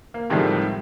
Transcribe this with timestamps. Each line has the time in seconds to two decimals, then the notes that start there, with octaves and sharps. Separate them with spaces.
0.14 A#3
0.30 A2 C3 D#3 F3 G3 G#3